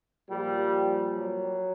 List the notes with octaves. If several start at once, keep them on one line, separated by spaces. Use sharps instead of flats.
A#2 F3 G3
F#3